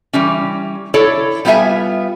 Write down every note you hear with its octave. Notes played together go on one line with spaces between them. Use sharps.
E3 G3 C#4
E4 A4 C#5 D5
G3 B3 F4 G4 E5 G#5